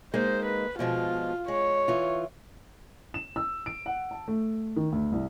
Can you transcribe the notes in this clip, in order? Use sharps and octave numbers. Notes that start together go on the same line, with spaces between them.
G#3 A#3 D#4 C5
B4
B2 F3 G#3 F4
G#3 C#5
E3 F4
E7
E6
D7
F#5
A5
A3
D#3
D2
C2